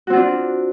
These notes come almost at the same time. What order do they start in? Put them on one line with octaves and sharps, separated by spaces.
F#4 C4 F4 D4